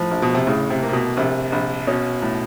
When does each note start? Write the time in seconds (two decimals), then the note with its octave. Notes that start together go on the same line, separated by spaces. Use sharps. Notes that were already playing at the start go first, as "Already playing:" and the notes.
Already playing: A#1 A2 F3
0.11 A#1
0.22 B2
0.35 C3
0.47 A2 C#3
0.70 C3
0.82 A#3
0.89 C3
0.93 B2
1.17 A#1 C3
1.52 A#1
1.87 B2 C#4
2.22 A2